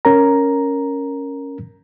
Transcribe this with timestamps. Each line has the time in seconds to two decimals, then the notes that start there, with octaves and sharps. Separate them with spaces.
0.05 C#4 A#4 A#5